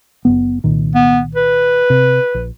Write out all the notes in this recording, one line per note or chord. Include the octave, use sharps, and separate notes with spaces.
F#1 F#2 B3
C2 A#2 D#3
B3
B4
C3
A#1